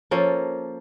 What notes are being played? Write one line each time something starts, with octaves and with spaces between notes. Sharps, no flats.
F3 A#3 C#4 A4